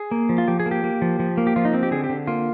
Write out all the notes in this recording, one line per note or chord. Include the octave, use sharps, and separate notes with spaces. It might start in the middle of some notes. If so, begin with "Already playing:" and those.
Already playing: G#4
A#3
F3
F4
F3 G4
G#4
A#3
G4
A#3
F3
F3
A#3
G4
F3 F4
D#4
C4
G4
D3 G#4
G4
D3
A#3 F4